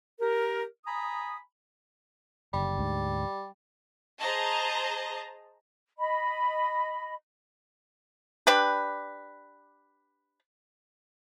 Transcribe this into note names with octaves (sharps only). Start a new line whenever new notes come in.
G4 A#4
G#5 A#5 B5 D#6
F#1 D3 G3
D2 G#2
G#4 C5 D#5 A5 A#5
D#5 B5
D4 G4 B4